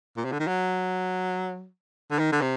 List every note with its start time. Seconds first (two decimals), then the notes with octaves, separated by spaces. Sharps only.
0.17 A#2
0.25 C3
0.32 D3
0.40 D#3
0.47 F#3
2.11 D3
2.19 D#3
2.32 D3
2.42 C3